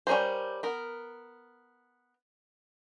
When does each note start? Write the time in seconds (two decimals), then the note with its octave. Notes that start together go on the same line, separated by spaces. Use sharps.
0.07 G3 C#4 G#4 A#4 C5
0.63 B3 A#4